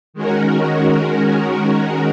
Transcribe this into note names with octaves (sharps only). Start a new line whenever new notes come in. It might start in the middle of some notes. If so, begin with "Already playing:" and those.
D#3 G#3 C#4 F#4 A#4